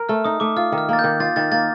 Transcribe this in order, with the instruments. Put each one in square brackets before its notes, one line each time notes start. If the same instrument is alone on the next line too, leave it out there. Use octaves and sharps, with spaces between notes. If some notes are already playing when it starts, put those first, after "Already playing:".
Already playing: [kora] A#4
[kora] A3 [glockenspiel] F6
[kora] D#4 [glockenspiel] D#6
[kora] A3 [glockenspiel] D6
[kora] F4 [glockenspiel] F6
[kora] D#3
[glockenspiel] F6
[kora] A#3 [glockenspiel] A6
[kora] D#3 [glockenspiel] G6
[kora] F4 [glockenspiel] A6
[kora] D#3 [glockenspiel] A6
[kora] A#3 [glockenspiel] A6